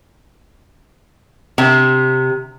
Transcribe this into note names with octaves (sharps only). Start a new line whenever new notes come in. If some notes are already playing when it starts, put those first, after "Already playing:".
C3